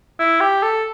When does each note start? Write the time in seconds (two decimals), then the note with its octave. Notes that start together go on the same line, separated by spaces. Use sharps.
0.20 E4
0.40 G4
0.63 A4